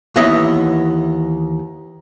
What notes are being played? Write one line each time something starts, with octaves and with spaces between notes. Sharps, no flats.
D#2 E3 B3 C#5 D#5 E5